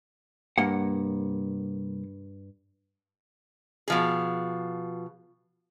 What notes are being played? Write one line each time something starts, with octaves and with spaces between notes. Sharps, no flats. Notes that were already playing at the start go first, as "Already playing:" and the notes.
C2 G2 A#3 F#5
B2 F3 G#4